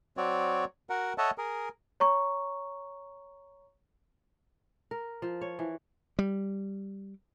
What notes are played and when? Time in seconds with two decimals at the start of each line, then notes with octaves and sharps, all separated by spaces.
0.17 F#3 C4 F#4 C#5 D5
0.90 F#4 A#4 F#5
1.18 A4 C#5 D#5 E5 F#5 A5
1.38 G#4 A#4
2.00 C#5 A#5 C#6
4.91 A#4
5.22 F3
5.41 C#5
5.59 E3
6.19 G3